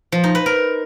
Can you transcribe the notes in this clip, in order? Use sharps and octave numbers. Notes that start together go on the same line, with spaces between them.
F3
D#4
B4
A#4